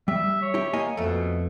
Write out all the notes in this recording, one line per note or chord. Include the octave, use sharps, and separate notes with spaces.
G3 E5
C#5
E4 G4
A#3 D#5 G#5
F2 B2 A3